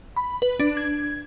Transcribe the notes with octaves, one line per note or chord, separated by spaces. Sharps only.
B5
B4
D4
G#6